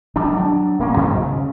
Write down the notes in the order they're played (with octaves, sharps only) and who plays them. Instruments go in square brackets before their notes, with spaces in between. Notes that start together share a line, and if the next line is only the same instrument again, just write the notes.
[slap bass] G#1 D#3 G3 D4
F#3 D4
D#1 A#3 C#4
F#2 C3 D#3 A3
B1 G#2 F#3 G#3
C#3